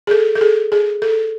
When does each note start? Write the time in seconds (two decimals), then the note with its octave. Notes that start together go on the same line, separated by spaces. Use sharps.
0.07 G#4
0.11 A4
0.35 A4
0.41 G#4
0.72 G#4
1.02 A4